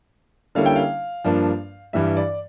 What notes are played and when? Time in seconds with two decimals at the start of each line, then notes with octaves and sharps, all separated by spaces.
0.55 D3 G3 A#3 C#4 E4 F5
0.66 G5
0.76 F5
1.24 G2 F3 A#3 D4
1.93 G2 E3 G3 E5
2.17 D5